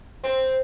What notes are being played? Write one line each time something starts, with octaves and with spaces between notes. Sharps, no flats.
C4